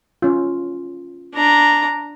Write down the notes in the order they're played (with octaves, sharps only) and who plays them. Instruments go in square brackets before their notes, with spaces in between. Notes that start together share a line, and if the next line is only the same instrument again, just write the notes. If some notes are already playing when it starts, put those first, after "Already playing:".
[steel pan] C#4 F4
[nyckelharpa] D4 A#5